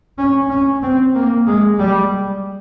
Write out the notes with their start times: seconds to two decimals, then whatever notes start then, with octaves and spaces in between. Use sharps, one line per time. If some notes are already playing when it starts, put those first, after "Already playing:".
0.18 C#4
0.49 C#4
0.82 C4
1.15 A#3
1.46 G#3
1.79 G3